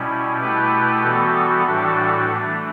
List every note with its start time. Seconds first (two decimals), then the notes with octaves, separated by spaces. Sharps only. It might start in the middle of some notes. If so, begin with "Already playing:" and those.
Already playing: B2 G3 C#4 E4
0.40 B2 A3 E4 G4 B4
1.03 E3 G3 B3 F#4 A4
1.66 A2 E3 G3 D4 F#4 A4
2.30 E3 A3 D4